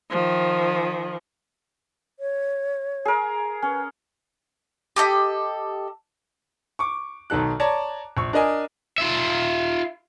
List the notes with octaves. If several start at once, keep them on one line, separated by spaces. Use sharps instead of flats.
D#3 F3
C#5
G#4 A#4
C#4 B4
G4 A4 D#5
C#6 D6
B1 D#3 A4 F#6
C#5 D5 A5 A#5
A#1 C#6
D4 A#4 D#5 G#5
F4 E5